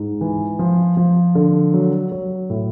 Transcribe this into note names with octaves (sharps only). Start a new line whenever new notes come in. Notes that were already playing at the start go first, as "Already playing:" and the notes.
Already playing: G#2
E3
F3
F3
D3
F#3
F#3
A2